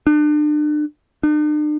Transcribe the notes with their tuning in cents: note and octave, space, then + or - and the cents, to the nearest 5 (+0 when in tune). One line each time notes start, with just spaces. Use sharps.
D4 +35
D4 +45